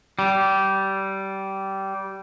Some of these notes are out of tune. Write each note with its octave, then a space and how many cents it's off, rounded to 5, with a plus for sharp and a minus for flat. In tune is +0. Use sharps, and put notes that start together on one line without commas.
G3 -20